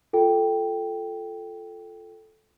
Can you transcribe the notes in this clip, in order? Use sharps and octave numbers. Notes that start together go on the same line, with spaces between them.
F4 A4 G5